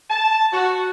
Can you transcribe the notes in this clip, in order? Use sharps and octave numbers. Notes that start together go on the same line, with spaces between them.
A5
F#4